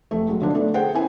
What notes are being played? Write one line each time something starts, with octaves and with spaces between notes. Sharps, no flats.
F1 A3
F#3 G#3
D3 F3 D4 D#4
A3 B3 D4 A4
G#4 A4 C5 F#5 G5
C#4 E4 A#4 G#5